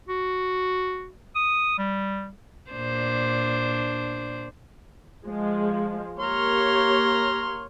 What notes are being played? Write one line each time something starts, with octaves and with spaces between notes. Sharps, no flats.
F#4
D#6
G3
A#2 D4 C5
F3 G#3
A#3 G4 C#5 A#5 C6 F6